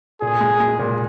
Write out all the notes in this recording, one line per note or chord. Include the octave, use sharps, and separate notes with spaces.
A#2 G#4
G#3
G#3
A#2